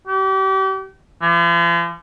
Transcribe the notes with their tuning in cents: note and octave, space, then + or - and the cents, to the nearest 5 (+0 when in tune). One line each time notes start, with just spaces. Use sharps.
G4 -35
F3 -45